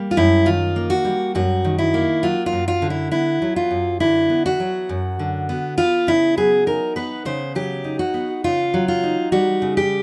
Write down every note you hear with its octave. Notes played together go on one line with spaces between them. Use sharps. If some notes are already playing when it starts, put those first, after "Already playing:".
Already playing: G3 A#3
F4
F#2 E4
D#3 F4
A#3
F#4
G3
F#2 F#4
D#3
E4
A#3
F#3 F4
F4
F#2
F4
D3
E4
B3 E4
F#3
F4
F#2
D3 E4
B3
F#4
F#3
F#2
D3
B3
B3 F4
C#3 E4
F#3 G#4
D#4 A#4
B3 B4
C#3 C5
F#3 G4
D#4
F#4
B3
C#3 F4
F#3
F4
D#4
G3 F#4
C#3
G4